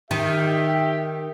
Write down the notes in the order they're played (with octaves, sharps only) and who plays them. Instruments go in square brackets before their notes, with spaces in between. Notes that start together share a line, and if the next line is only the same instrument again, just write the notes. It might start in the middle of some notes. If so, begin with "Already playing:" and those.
[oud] D#3 [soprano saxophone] G4 [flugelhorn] E5